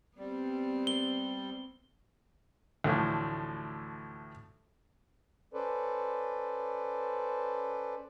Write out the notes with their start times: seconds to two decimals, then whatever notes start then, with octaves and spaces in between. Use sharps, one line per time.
0.18 G3 B3 C4
0.87 G7
2.84 D2 A2 E3 F3
5.54 C#4 A4 B4 C5 D5